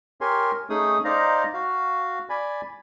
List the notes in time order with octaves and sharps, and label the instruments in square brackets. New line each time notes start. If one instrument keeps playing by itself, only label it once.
[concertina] G4 A#4 C#5 G#5 C6
A3 C#4 D#4 G#4 D#6
D#4 C5 D5 D#5 F5 A#5
F#4 F5
D5 G#5 B5